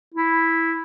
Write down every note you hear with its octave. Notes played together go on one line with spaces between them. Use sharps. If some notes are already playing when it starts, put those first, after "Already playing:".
E4